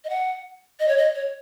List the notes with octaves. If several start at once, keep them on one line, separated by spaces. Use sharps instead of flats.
D#5
F#5
D#5
C#5
D#5
C#5